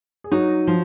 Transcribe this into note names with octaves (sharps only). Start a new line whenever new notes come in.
G#4
F#3 D#4 F#4
F3